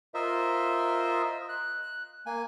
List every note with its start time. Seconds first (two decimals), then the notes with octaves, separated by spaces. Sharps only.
0.14 F4 A#4 C5 D#5 E5
1.49 F#6
2.26 A#3 G#5